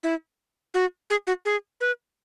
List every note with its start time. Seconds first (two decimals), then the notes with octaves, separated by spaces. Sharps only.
0.03 E4
0.74 F#4
1.10 G#4
1.27 F#4
1.45 G#4
1.81 B4